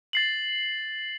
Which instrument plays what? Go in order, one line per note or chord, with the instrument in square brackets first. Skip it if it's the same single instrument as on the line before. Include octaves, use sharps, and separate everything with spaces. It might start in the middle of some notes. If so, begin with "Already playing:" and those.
[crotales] A6 C7 F#7